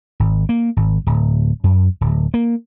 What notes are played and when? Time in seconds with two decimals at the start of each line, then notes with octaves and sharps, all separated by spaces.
0.20 G#1
0.49 A#3
0.77 G#1
1.06 D1
1.64 F#2
2.01 D1
2.34 A#3